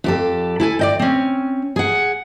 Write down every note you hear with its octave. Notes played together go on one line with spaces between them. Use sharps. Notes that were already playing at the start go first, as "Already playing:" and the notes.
F2 G4 A4
E4 A4 G#5
D5 D#5 G5
C4 C#4
G#4 F#5